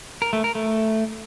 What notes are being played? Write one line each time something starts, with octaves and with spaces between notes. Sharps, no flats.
A#4
A3
A#4
A3